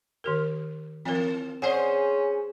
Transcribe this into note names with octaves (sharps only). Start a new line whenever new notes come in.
D#3 G4 A#4
E3 C4 A#4
C#4 G#4 C5 D5 F#5